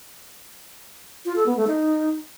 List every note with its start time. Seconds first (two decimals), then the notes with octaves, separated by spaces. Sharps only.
1.25 F4
1.36 A4
1.46 B3
1.57 A3
1.67 D#4